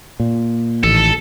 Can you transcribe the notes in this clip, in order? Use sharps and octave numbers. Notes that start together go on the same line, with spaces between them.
A#2
A1 D#3 A4